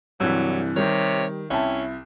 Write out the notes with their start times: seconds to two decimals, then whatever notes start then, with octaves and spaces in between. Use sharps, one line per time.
0.20 C2 G2 C3 E3 F#3 E6
0.76 C3 D#3 G3 G4 C#5
1.50 C2 C#4 E4 E5 G5 A5